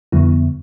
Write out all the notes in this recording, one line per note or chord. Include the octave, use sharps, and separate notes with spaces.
F2 D3 G3 B3 E4